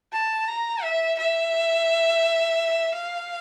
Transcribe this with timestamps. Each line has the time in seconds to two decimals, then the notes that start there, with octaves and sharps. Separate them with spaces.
0.13 A5
0.48 A#5
0.83 E5
1.18 E5
2.93 F5